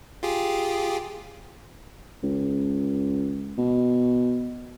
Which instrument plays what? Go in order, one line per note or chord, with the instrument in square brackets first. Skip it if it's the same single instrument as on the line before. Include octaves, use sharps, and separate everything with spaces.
[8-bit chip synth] F4 G4 G#4
[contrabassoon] C#2
B2